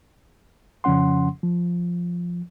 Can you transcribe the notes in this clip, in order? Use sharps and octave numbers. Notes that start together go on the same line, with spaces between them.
F2 C#3 F3 C#4 F#5 C6
F3